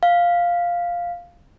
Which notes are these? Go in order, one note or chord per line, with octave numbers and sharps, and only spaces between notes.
F5